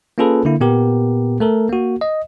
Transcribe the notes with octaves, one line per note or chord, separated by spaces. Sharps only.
A#3 C#4 F4 G#4 A4 B4
D3 A#3 E4
A#2 B3 G4 A#4
A3 A4 A#4
A#3 F#4
D#5